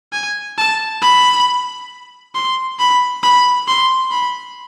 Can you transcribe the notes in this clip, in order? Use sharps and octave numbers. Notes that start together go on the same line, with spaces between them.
G#5
A5
B5
C6
B5
B5
C6
B5